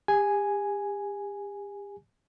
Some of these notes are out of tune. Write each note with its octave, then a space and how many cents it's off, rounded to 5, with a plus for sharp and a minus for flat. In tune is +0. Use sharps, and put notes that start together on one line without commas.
G4 +40 G#5 +0